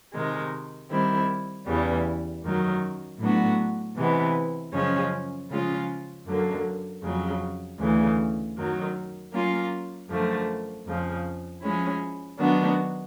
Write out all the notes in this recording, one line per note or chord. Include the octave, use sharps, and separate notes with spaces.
C3 D#3 G#3
D#3 G3 C4 E4
E2 C#3 E3 G3
F#2 D#3 F#3
A2 F#3 B3 D4 F#4
C3 E3 G#3 B3
F#2 C#3 F3 G#3 C#4
C#3 F3 G#3 C#4 F4
F#2 D3 F#3 A#3
F2 C#3 F#3
D2 C#3 E3
F#2 D#3 F#3
F#3 A#3 C#4 F4
F#2 D3 F3 A3
F2 C#3 F3
F3 G#3 C#4 E4
D#3 F#3 B3 D4 F#4